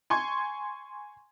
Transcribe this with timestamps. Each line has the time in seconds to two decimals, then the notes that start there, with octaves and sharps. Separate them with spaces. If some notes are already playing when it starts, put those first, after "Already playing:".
0.10 G#5 C6 C#6 G#6